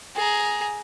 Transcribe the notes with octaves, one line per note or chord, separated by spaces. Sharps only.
G#4 A#5